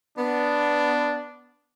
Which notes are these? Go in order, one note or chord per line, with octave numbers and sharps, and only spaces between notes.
B3 D4